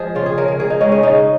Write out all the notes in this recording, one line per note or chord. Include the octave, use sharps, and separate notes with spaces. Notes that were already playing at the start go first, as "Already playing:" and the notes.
Already playing: F3 G#3 G#4
C#3 F4
G#4
C#3 A#4
A#4
C#3 G#4
D#4
G#3 C#4
C#4
C#3 D#4